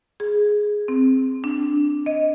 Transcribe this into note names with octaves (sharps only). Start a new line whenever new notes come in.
G#4
C4
D4
D#5